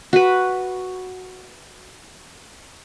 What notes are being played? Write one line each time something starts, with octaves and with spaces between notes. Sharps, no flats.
F#4 B4